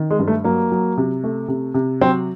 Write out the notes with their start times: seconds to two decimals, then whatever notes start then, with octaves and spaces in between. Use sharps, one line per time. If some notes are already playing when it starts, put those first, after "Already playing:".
Already playing: D#3
0.10 G#3
0.19 G2
0.28 A3
0.44 F#3 A#3
0.72 F#3
0.97 C3
1.24 A3
1.48 C3
1.74 C3
2.01 F#3 C4